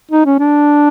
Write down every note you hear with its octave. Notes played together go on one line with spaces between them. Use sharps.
D#4
C#4
D4